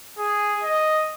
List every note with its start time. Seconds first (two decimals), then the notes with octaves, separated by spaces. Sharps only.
0.18 G#4
0.63 D#5